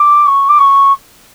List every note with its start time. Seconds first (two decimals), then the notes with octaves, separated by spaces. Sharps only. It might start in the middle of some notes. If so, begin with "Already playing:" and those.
Already playing: D6
0.26 C#6
0.49 D6
0.58 C#6